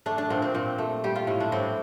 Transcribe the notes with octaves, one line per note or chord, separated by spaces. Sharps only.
A3 D4
D4
A#2 C4
C4
A#2 C4
A3
G3 G4
F4
A2 E4
D4
A2 C4